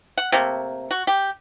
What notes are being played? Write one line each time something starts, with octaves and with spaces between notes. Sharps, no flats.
F#5
C3 A3 A#3
F#4
G4